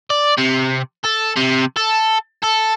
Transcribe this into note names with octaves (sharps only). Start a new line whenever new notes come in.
D5
C3
A4
C3
A4
A4